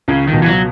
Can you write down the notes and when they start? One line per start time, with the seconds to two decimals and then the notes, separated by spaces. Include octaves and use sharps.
0.08 C#2 C#3
0.28 D#3
0.33 B2
0.42 E3
0.46 F#3